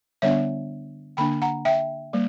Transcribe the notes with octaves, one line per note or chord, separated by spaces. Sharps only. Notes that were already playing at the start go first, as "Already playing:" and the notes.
D3 G3 B3 D4 C#5 E5
D3 A#3 D4 G5 B5
F#5 A#5
E5 G5
G3 A#3